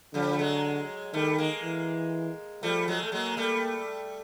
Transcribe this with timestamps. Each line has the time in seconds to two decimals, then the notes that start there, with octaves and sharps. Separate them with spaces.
0.14 D3 F3 G3
0.33 A3
0.39 F#3 G#3
1.13 D#3 G3 A3
1.38 G#3 A#3
1.63 E3
2.63 F3 G3 A3
2.88 F#3 G#3
3.03 A3
3.12 F#3 G#3 A#3
3.37 G3 A3